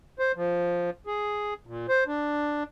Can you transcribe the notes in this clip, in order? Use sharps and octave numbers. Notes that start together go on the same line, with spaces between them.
C5
F3
G#4
A#2
C5
D4